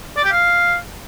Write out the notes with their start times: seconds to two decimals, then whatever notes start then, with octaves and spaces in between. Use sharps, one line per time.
0.17 D5
0.24 G4
0.32 F5